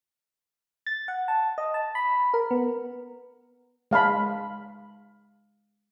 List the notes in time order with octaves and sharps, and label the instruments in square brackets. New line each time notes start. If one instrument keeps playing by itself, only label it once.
[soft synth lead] A6
F#5
A5
D#5
A5
B5
A#4
B3
[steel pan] G#3 F5 A5 B5